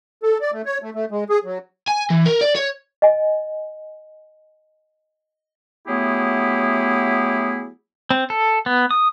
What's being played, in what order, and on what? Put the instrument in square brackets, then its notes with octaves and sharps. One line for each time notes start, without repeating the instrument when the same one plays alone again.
[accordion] A4
D5
A3
C#5
A3
A3
G#3
G#4
F#3
[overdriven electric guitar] G#5
E3
A#4
D5
C#5
[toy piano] D#5 G#5
[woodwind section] F#3 A3 B3 E4 G4 G#4
[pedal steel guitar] C4
A4
B3
D#6